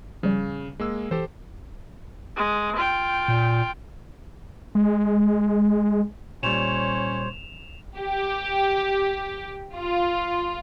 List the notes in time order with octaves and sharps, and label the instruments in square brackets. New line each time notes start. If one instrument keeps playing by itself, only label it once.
[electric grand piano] C#3 [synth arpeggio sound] F3 G3
[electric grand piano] G#3 A#3 E6
[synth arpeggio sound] E3 [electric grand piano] G4 A4 C5
[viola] G#3
F4 G5
[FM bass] A#2
[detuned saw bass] G#3
[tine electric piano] A#2 G3 [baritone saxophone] C#4 [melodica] C5 C#5 [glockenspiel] E7 F7
[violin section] G4
F4